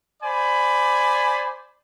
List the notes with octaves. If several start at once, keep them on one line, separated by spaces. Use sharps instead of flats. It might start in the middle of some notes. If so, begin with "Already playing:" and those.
C5 D5 G#5 B5